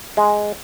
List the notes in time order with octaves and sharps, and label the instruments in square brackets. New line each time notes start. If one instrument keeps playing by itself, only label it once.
[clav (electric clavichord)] G#3